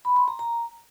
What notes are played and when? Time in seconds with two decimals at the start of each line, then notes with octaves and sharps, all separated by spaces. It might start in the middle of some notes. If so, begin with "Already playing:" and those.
0.05 B5
0.16 C6
0.28 A#5
0.39 A#5